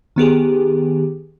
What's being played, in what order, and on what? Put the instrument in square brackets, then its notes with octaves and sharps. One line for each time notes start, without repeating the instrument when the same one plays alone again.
[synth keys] D#3 B3 G4 G#4